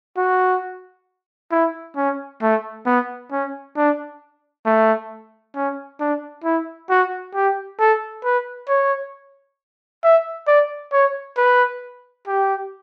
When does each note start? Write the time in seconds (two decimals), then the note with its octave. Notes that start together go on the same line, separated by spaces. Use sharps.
0.17 F#4
1.52 E4
1.97 C#4
2.42 A3
2.86 B3
3.31 C#4
3.76 D4
4.66 A3
5.55 C#4
6.00 D4
6.44 E4
6.90 F#4
7.35 G4
7.79 A4
8.24 B4
8.68 C#5
10.03 E5
10.47 D5
10.92 C#5
11.37 B4
12.27 G4